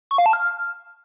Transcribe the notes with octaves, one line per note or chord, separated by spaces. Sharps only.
C#6
F5
A5
F6